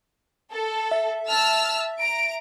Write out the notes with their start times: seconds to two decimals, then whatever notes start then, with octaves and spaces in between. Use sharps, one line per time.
0.51 A4
0.91 E5
1.28 A5 E6 F6
1.99 A#5 D7